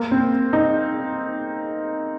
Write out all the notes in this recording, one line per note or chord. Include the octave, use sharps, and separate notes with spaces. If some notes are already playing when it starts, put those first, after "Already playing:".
Already playing: A#3
C4
D#4